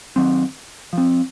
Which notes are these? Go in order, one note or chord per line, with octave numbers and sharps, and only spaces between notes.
D#3 F#3 C4
F3 C4